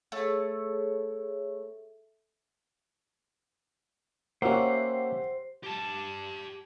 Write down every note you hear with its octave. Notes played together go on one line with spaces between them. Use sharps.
A3 G#4 A4 C#5
A#3 C#4 G4 C5 E5 F#5
G4 A5